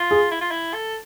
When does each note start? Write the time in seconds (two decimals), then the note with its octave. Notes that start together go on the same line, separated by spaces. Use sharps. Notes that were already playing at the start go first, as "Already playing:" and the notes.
Already playing: F4
0.11 G#4
0.31 E4
0.41 F4
0.51 E4
0.74 A4